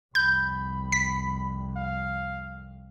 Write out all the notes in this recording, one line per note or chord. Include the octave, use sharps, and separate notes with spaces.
C2 F2 B5 G6
B6
F5